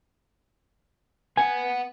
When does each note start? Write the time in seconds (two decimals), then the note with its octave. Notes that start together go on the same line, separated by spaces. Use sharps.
1.37 B3 F#5 G#5